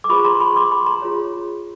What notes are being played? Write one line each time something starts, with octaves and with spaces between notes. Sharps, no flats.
D6
F4 G#4 C5 B5 C#6
A#5 C6
C6
B5 C#6
C6 D6
B5 C#6
A#5 C6
F4 G#4 C#5